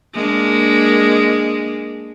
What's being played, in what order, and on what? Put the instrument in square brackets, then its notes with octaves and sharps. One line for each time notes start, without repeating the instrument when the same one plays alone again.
[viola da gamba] G#3 A#3 D4